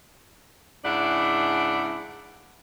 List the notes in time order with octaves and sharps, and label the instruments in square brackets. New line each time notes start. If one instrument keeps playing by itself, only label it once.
[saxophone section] G#2 C#3 D4 E4 F#5